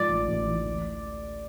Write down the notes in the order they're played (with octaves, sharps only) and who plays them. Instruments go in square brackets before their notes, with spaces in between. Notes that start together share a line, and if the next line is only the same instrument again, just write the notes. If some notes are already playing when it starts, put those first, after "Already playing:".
Already playing: [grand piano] G#2 F3 [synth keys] D5
[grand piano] A1
A1
E3
D2